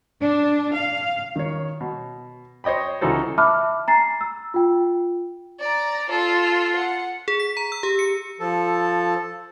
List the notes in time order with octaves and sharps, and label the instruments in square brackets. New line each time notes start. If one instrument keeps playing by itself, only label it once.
[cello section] D4
F5
[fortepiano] D#3 C#5
B2
C5 C#5 D#5 G5 B5
C#2 E3 D#4 F#4 A4 C5
[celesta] E5 A5 B5 D6 F6 F#6
G#5 A#5 A6 C7
E6
F4 G5
[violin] D5 A#5
F4 A4
F#5
[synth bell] G#4
B6
A#5
E6
G4
C#7
[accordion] F3 A4